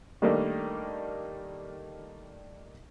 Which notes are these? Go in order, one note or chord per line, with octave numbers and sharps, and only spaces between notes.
D#3 G3 A3 A#3 D4 D#4